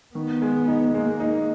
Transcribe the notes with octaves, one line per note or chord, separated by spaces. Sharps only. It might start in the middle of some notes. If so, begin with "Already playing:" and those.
D#3 B3
G#3
D#4
G#3 A#3
D#4